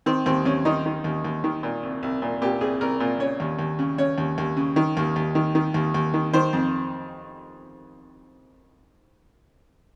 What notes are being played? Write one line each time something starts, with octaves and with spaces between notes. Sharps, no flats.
D#3 C4
D#2 C4
D#2 C#4
D#3 D#4
D#3
D#2
D#2
D#3
A#2
C2
C2
A#2
A#2 G4
C2 G#4
C2 A#4
A#2
C#3 C#5
D#2
D#2
C#3
C#3 C#5
D#2
D#2
C#3
D#3
D#2
D#2
D#3
D#3
D#2
D#2
D#3
D#3 C5
F2